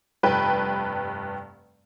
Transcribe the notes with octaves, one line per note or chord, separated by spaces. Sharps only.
F1 G2 B4 G5